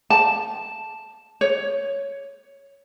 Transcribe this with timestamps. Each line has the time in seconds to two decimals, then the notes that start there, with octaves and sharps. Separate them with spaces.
0.10 A5
1.41 C#5